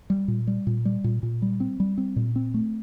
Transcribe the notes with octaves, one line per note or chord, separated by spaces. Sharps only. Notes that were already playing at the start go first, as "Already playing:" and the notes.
G3
A#2
G3
A#2
G3
A#2
A#2
G3
C4
G3
C4
A#2
C4
A3